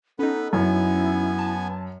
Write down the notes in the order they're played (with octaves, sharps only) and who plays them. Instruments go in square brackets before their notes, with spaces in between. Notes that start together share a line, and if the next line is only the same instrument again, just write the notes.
[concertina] B3 B4 [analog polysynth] C#4 D#4 [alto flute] A4
[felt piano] F#2 [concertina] B3 G#5 [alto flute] E4
[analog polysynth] A5